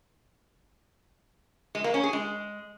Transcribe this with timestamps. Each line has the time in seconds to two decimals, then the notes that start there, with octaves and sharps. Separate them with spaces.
1.75 G#3
1.84 A#3
1.94 C#4
2.03 G#4
2.13 G#3